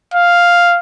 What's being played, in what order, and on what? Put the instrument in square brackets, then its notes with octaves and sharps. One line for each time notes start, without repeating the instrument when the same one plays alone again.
[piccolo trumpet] F5